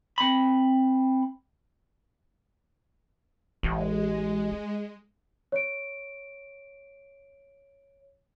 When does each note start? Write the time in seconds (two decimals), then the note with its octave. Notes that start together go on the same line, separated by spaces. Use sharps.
0.18 C4 B5
3.63 A1 G#3
5.52 C#5 D7